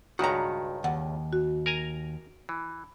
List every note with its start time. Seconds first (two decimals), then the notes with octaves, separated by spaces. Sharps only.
0.19 C#2 G2 D#3 F#4 A#5
0.84 D#2 F#5
1.33 F#4
1.66 A#4 G#5 A#5
2.49 E3